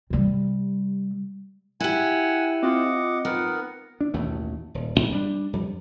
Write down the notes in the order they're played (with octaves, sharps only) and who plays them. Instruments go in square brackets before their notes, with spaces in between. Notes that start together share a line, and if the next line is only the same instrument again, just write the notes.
[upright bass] C3 G3
[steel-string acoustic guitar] E4 G4 [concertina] F#5 G#5
[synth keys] C4 F4 [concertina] D#5 F#5 D6
[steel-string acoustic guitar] D#3 [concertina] B3 A#4 F#5
[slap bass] D4
A1 D#2 B2 A3
D#1
D#1 G#1
G3 D4
F2 F3 G3